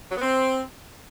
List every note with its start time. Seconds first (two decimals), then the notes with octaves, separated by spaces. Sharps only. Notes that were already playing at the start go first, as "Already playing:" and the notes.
0.10 F#3
0.16 B3
0.22 C4